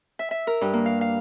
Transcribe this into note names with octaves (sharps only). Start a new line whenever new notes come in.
E5
E5
A#4
G2
A#3
F5
F5